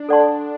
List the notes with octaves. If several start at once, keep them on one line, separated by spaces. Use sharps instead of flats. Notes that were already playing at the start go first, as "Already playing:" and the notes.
Already playing: D4
A4 D5 F#5 A5 C6